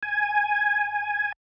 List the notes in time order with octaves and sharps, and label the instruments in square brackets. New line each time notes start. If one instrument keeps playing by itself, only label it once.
[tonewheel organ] G#5